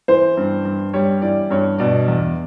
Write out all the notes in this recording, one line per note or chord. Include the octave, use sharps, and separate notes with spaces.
E3 C5
G2
G2
G3 C#5
E3 D5
G2 C#5
B2 D5
E2